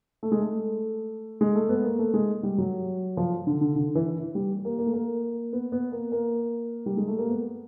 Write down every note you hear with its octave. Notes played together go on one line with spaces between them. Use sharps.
A3
G#3
A3
G#3
A3
B3
A#3
A3
G#3
G3
F#3
F3
D3
D3
D3
E3
G3
A#3
A#3
A3
A#3
B3
B3
A#3
A#3
G3
G#3
A3
A#3
B3